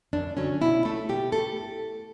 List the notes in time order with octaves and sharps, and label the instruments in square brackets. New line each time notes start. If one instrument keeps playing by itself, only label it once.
[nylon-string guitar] F#2 D4
D3 F#3 C#4
B2 E4
A3 A4
B2 G4
A3 A4